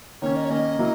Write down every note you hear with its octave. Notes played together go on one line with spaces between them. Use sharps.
D#3 A#3 C#4 C#5
D#5
C#5
D#3 A#3 C#4 D#5
F#3 A#3 E4